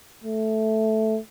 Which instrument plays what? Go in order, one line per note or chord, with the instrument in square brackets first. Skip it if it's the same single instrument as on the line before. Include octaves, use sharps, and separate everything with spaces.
[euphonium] A3